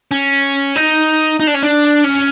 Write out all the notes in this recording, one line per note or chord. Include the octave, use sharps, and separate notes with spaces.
C#4
D#4
D#4
D4
C#4
D4
C#4